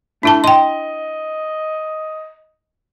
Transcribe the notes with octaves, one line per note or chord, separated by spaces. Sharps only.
A3 D4 E4 A5
D#5 G5 C6